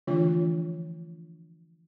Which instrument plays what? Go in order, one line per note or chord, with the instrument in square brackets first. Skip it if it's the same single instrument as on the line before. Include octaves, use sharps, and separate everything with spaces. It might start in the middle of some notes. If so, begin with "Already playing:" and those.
[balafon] D3 E3 F3 A3 D4 F4